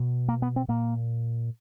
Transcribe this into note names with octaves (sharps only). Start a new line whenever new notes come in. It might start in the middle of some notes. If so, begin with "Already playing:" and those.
Already playing: B2
A#3
B3
C4
A#2 A#3